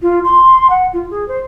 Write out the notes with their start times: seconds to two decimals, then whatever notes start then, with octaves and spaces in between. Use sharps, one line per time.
0.02 F4
0.24 C6
0.70 F#5
0.93 F4
1.10 G#4
1.28 C5